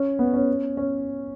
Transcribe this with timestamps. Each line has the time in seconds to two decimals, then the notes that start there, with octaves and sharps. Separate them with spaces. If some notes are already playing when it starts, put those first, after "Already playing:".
Already playing: C#4
0.19 B3
0.34 C#4
0.77 C#4